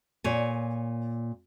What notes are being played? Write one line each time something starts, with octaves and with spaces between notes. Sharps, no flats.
A#2 C#5 G#5